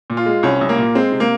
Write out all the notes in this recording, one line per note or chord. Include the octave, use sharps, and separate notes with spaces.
A#2
F4
G#3
C2 C#4
C2
A#3
A#2
G#3 C4
C3
A#3